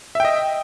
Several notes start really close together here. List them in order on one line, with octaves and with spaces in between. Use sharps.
E5 G5 D#5